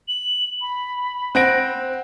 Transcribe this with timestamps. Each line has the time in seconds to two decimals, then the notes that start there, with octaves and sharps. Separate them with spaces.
0.08 F#7
0.61 B5
1.35 C4 C5 F#5 F#6 A#6 D7